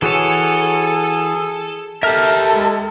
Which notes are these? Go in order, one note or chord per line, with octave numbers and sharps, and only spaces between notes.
E3 F#4 G#4 A4 C#5
G4 A4 A#4 E5 F6
G#3